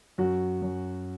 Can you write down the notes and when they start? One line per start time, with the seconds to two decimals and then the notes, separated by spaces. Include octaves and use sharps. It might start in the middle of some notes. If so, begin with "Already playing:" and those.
0.18 F#2 F#4
0.62 F#2